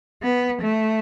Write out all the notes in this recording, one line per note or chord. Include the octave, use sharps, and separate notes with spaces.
B3
A3